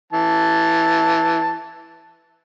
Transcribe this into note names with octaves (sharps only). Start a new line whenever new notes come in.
E3 A5